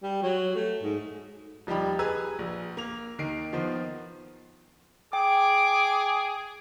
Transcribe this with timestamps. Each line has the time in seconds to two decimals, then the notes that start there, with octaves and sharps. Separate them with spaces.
0.03 G3
0.23 F#3
0.55 A3
0.83 G#2
1.67 D#1 F3 G3 D#4 G4 B5
1.99 G#4 B4 A#5 E6 G#6
2.39 A#1
2.77 A#3 F7
3.18 D#2 D#3 C7 D7
3.53 D#3 F3 B3 C5
5.13 G#4 G5 D6